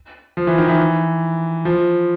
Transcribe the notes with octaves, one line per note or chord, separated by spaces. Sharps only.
F3
E3
D#3
E3
F3